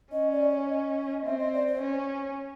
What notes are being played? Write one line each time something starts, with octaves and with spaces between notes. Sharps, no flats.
C#4 D#5
D5
C#5
D#5
C4 E5
D#5
D5
C5
C#4